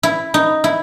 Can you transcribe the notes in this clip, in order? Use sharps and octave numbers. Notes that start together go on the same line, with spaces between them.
E4
D#4
E4